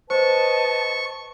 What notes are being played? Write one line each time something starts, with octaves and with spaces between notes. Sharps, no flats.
B4 C5 D#5 A5 C#6